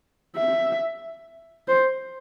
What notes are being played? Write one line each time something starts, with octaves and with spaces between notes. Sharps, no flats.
E5
C5